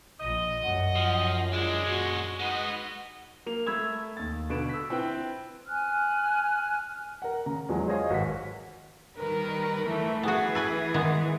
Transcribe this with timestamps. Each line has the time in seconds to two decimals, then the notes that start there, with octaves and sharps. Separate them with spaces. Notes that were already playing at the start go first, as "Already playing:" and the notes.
0.20 A#1 D#5
0.64 F#2 F#5
0.96 F3
1.53 E3 G#3 D4 F4
1.86 A#2 C#4 F#4
2.39 G#3 D#4 F#4 B4 D#5 F#5
3.46 A#3 F7
3.66 A3 B5 E6 G#6 E7
4.17 D#2 A6
4.50 B2 D3 B4 D7 E7
4.69 E6 B6
4.90 C4 E4 B4 G5
5.68 G#5 F6 F#6
7.22 A#4 F#5
7.46 C#3 A#5
7.69 E2 F3 F#3 G#3
7.87 G#4 C5 C#5 D#5 F5
8.10 G#1 F#4 B4 B6
9.16 D#3 G3 A#4 B4
9.87 E3 A3
10.23 E3 B3 F#4 G#4
10.55 A4 B4 G#5
10.94 D#3 G#3 B3